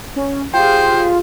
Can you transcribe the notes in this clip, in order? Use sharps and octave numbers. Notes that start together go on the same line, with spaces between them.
C#4
F4 G4 G#4 C5 G5